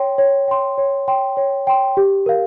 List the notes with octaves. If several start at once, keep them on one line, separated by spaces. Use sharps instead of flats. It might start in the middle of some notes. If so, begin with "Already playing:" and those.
Already playing: C#5 G5 C6
C#5
G5 C6
C#5
G5 C6
C#5
G5 C6
G4
A#4 F5